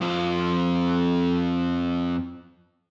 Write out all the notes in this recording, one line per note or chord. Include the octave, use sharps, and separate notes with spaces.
F2 F4